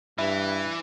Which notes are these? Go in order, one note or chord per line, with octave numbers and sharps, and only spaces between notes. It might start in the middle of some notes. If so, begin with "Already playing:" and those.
G2 E3 E4